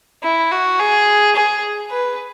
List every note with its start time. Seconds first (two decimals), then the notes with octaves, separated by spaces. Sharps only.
0.23 E4
0.51 F#4
0.79 G#4
1.35 G#4
1.90 B4